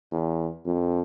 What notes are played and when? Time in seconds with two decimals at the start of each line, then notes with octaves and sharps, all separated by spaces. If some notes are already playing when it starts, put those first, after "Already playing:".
0.11 E2
0.66 F2